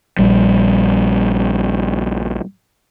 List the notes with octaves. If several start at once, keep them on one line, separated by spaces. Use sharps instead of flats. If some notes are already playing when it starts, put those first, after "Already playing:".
A#1 G3